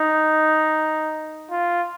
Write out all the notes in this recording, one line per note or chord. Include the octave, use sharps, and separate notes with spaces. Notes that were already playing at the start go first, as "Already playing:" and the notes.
Already playing: D#4
F4